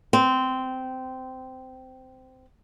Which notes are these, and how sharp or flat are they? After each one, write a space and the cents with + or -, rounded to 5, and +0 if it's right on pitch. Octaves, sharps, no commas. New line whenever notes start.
C4 -15